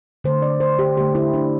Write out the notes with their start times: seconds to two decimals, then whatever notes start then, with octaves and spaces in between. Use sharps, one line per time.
0.24 D3 A3 C5
0.42 D5
0.60 C5
0.79 G4
0.97 D3 A3 G4
1.15 E4
1.34 D4